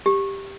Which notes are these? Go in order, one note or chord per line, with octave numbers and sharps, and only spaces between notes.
G4